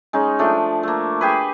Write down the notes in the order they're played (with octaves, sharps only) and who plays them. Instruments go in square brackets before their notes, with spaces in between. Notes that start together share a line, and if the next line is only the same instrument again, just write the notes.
[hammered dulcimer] G#3 C#4 D#4
F3 A3 D4
A3 A#3
G4 G#4 B4